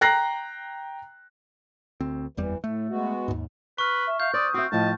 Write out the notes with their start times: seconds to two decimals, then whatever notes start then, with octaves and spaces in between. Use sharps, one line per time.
0.01 G5 A#5 F#6 A#6 C7
2.00 D2 C4
2.37 F#1 E2 E3 G3
2.64 A2 A3
2.89 G#3 B3 F#4
3.28 D#2 G#2
3.78 B4 C#6 F6
4.07 E5
4.20 E5 F5 G6
4.33 C5 D5 D#6
4.54 C4 F#4 E5
4.72 A2 F3 D#5 A5